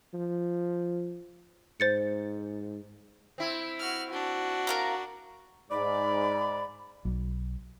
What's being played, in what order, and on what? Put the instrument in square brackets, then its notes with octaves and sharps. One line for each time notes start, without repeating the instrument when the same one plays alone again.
[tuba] F3
[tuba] G#2 [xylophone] C5 A6 C#7
[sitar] C4 E4
[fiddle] F#4 F6
[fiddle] D4 [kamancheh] F#4
[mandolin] A#4 F5 A#5
[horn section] G#2 D5 [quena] B5
[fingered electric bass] B1 F#3